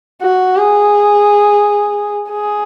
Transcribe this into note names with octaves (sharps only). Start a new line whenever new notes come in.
F#4
G#4
G#4